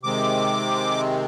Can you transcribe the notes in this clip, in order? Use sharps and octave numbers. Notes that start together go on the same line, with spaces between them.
C3 D#3 G#3 C4 D6